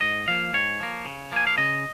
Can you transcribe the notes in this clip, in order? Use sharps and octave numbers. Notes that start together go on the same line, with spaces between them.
G#2 D#5
F3 A#3 F5
G#2 C#5
F3 A#3
C#3
F3 A#3 G#5
F5
C#3 D#5